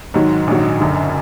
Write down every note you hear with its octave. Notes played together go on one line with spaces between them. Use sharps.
G#2 D#3 F#3
A#1 G#2 D#3 F#3
F#1 F#2 D3